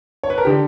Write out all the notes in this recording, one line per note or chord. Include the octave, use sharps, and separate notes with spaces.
C#5
B4
A#4
D3 G4